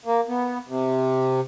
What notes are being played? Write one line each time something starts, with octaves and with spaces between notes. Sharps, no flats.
A#3
B3
C3